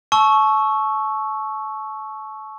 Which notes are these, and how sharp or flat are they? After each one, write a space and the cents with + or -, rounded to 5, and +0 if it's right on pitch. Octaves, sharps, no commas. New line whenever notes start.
A5 -30 C#6 +0 E6 +0